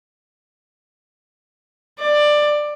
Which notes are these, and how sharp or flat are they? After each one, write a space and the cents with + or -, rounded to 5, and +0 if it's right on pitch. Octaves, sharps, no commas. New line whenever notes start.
D5 +15